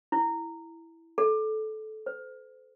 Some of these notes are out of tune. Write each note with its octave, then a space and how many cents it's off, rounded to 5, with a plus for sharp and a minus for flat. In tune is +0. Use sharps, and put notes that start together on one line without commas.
E4 +0
A4 -20
C5 -35